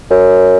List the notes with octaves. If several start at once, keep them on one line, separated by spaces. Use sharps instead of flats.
F#2